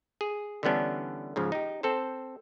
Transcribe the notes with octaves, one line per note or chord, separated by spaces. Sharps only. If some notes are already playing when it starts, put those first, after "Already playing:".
G#4
D3 E3 G3 B3 C#4 D4
G#2 C#3 F3
D#4 G4
C4 A4 C5